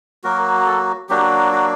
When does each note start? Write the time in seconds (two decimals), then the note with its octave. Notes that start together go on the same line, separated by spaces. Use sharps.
0.24 F#3 A#3 F#4 A#4
0.66 A4
1.09 F#3 A#3 D4 F#4 G4
1.53 F#4